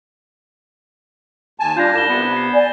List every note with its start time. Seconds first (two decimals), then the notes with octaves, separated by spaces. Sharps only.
1.60 D#2 G#5 A5
1.77 G3 D4 F4 G6 G#6 A#6
1.94 C2 G6 E7 G7
2.09 C3 B3
2.37 C7
2.54 D5 G#5